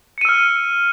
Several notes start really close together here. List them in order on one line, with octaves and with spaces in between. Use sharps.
C#7 D#7 E6 F6